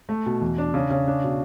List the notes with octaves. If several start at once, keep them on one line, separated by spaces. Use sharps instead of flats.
A3
B2
E2
D4
C#3
C#3
D4
B2